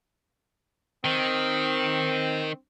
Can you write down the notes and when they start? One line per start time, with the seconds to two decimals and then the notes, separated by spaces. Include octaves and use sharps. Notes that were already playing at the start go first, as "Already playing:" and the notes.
1.05 D#3 C4